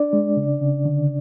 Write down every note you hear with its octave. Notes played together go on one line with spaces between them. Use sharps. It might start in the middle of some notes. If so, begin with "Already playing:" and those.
Already playing: D4 D5
G#3
C#3
C#3
D3